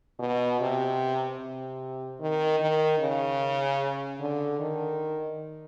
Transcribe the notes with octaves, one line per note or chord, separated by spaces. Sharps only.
B2
C3
C3
D#3
D#3
C#3
D3
D#3